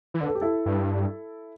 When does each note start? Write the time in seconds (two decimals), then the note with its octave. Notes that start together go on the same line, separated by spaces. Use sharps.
0.14 E3
0.21 D3 B4
0.28 A4
0.35 G4
0.41 E4 A4
0.66 G2